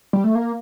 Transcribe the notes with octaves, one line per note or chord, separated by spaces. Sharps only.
G3
A3
A#3